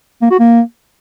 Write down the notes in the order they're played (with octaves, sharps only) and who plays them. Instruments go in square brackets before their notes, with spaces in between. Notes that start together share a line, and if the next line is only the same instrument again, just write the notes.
[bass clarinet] A#3
F#4
A#3